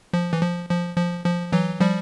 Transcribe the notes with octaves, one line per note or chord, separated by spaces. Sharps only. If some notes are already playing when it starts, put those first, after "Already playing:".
F3
E3
F3
F3
F3
F3
E3 F#3
F3 G3